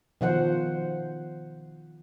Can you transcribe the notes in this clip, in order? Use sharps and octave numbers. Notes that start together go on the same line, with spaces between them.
B2 D#3 F3 C5 F#5